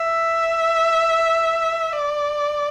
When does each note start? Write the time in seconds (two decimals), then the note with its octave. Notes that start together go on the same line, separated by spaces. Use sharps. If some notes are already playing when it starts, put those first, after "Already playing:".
Already playing: E5
1.93 D5